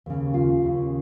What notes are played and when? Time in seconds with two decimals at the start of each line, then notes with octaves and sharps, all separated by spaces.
0.06 D#2 C#3
0.34 F4
0.62 D#2 C#3